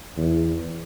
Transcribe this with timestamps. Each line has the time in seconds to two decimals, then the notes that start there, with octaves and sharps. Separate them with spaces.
0.17 E2